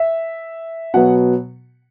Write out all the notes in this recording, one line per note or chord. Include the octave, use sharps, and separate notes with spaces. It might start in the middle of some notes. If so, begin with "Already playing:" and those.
Already playing: E5
B2 F#3 B3 F#5